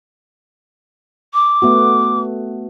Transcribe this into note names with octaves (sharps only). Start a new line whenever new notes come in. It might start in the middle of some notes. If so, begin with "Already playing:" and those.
D6
A3 B3 F#4